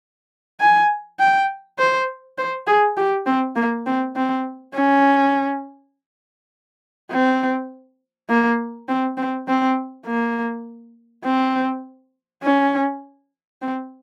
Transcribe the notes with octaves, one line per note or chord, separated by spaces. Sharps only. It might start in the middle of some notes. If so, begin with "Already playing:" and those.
G#5
G5
C5
C5
G#4
G4
C4
A#3
C4
C4
C#4
C4
A#3
C4
C4
C4
A#3
C4
C#4
C4